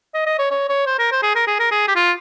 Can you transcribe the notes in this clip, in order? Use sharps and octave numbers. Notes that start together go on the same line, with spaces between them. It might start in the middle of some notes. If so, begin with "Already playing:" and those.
D#5
D#5
C#5
C#5
C#5
C5
A#4
C5
G#4
A#4
G#4
A#4
G#4
G4
F4